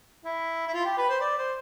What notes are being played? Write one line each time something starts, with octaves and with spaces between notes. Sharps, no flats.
E4
E4
F4
G4
B4
C5
D5
C5